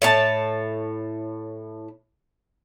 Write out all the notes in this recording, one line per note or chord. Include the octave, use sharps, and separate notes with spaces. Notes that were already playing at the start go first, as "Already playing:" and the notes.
A2 C#5 A5